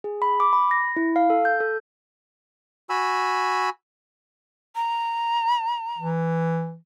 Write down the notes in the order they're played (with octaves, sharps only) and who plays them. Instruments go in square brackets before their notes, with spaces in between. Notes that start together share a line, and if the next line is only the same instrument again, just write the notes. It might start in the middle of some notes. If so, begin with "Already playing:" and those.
[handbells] G#4
B5
D6
B5
A#6
E4
F5
A4
G6
A4
[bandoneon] F#4 G#5 B5 E6
[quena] A#5
[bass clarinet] E3